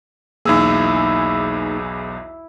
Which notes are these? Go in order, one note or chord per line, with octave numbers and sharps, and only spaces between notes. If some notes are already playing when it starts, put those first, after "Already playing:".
B1 E2 A#3 D#4 E4 G#4 E6